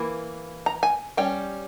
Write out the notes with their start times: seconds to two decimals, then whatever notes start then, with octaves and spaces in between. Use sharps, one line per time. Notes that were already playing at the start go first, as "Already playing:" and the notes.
Already playing: E3 A#3
0.66 A#5
0.83 G#5
1.17 G3 C#4 G5